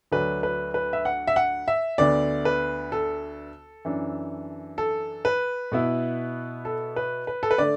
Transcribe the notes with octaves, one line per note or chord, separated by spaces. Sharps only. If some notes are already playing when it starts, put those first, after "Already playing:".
D2 D3 F#3 D4 B4
B4
B4
E5
F#5
E5
F#5
E5
D2 D3 B3 D5
B4
A4
F#2 E3 D4
A4
B4
B2 B3 E4
A4
B4
B4
A4
B4
D3 A3 D5